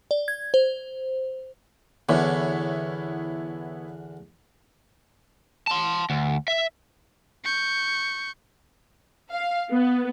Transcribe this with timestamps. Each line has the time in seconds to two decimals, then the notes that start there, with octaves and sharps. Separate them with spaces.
0.11 D5
0.28 G#6
0.54 C5
2.09 E2 D3 B3 E4 C#5
5.67 A5 C6
6.10 D2
6.48 E5
7.44 C#6 G6
9.32 F5
9.73 B3